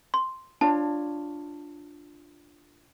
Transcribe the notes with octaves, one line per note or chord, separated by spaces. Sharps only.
C6
D4 F4 C#5 A5